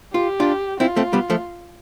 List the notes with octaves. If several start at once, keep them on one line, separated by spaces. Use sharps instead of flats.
F4 G4
D4 F4
C4 E4 F4
A3 C4
G3 B3
F3 A3